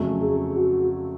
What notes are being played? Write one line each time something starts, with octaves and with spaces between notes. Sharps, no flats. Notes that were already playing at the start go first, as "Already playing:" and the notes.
Already playing: F2 C#3 F#3 A3
G#4
F#4